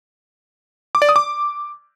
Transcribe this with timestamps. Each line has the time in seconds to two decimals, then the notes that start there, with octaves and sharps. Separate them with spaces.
0.95 D6
1.02 D5
1.09 D#6
1.16 D6